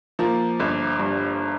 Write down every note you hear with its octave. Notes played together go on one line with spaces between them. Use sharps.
F3 A#3
G1
G2